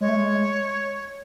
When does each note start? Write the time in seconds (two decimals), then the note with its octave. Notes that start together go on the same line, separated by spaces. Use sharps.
0.01 G#3 C#5
0.08 A3
0.16 G#3